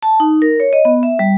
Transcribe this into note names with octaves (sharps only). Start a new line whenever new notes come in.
A5
D#4
A#4
C#5
D#5
B3
E5
G3